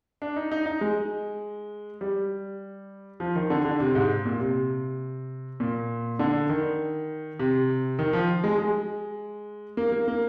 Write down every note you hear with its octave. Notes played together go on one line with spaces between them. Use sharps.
D4
D#4
D#4
D#4
G#3
G3
F3
D#3
D3
D3
C3
G#2
A#2
C3
A#2
D3
D#3
C3
D#3
F3
G#3
G#3
A#3
A#3
A#3